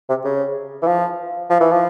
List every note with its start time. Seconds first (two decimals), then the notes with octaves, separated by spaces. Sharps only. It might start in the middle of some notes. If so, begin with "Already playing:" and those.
0.09 C3
0.25 C#3
0.83 E3
0.87 F3
1.50 F3
1.60 E3
1.72 F3